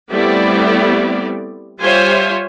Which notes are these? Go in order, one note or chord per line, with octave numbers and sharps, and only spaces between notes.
G3 A3 B3 C4 E4 D5
G3 F4 C5 C#5 E5 G#5